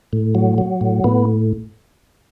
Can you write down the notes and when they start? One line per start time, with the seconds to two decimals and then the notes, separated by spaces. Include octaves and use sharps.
0.13 A2
0.35 F#3
0.58 F#3
0.81 A2
1.04 A2 B3